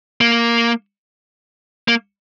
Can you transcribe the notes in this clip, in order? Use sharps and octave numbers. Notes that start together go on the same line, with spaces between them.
A#3
A#3